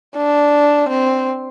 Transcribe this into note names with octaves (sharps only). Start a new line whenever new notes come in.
D4
C4